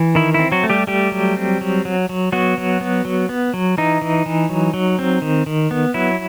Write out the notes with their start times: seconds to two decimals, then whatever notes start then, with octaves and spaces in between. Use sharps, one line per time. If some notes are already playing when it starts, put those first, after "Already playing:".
Already playing: E3
0.15 D#3 E4
0.34 C4 E4
0.52 F#3 F#4
0.63 A3
0.70 G3 G4
0.87 G3 A3 G4
1.12 F#3
1.37 C4
1.61 F#3
1.85 F#3
2.09 F#3
2.32 F#3 B3 F#4
2.58 F#3
2.81 B3
3.05 F#3
3.29 B3
3.54 F#3
3.78 E3 D#4
4.02 E3
4.26 E3
4.49 F#3
4.74 F#3
4.99 C4
5.22 D#3
5.46 D#3
5.71 B3
5.94 F#3 E4